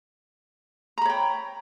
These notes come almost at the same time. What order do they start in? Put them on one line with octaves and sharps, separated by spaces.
A#5 B5 C#5 G5